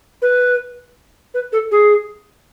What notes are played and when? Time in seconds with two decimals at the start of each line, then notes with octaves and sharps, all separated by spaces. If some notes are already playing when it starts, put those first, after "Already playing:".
0.22 B4
1.34 B4
1.52 A4
1.71 G#4